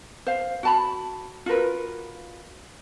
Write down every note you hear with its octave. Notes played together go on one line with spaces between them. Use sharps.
C5 F5
F#4 A5 B5
F4 F#4 A#4 B4